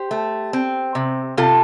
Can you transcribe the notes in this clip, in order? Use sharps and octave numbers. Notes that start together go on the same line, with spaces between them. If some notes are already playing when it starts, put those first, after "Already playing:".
Already playing: G4 C5
A3
C4
C3
C3 F4 A4